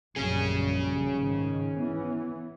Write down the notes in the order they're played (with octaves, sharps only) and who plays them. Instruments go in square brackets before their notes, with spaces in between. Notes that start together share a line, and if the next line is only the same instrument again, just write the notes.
[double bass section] A#1 F#2 G3 [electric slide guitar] C#4 G#4
[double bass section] G#2 D#3
E3 B3